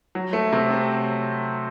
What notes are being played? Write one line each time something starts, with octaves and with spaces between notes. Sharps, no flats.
F#3
A3
C3
C4